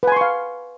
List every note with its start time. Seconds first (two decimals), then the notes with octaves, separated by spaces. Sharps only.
0.03 B4
0.07 G#5
0.12 C6
0.17 C#6
0.21 F5